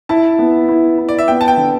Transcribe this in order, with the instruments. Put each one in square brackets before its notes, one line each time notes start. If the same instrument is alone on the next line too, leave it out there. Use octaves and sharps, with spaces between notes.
[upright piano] E4 [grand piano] A5
[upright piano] B3
E4
E4
[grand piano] D5
E5
[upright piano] B3 [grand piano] G5
[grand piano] A5
G5
[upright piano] D3